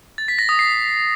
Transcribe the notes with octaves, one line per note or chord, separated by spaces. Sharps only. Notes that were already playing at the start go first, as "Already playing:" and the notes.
A6
B6
A#6
D#6
C7